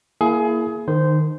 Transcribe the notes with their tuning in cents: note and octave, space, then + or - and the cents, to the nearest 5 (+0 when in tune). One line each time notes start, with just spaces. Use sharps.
A#3 +5 E4 +20 G#4 +25
D#3 -20 C5 -15